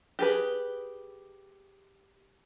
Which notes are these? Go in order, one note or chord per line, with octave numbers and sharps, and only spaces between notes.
G4 G#4 B4